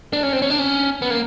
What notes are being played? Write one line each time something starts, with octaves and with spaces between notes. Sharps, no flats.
D4
C#4
C4
C#4
D4
C#4
B3
A#3